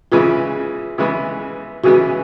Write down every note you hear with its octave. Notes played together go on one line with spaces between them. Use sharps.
C#3 E3 G#3 B3 F4
C#3 E3 G#3 B3
C#3 E3 G#3 B3 F#4